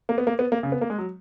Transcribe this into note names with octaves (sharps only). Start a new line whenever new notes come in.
A#3
B3
A#3
B3
A#3
C#3
B3
A#3
G#3
F#3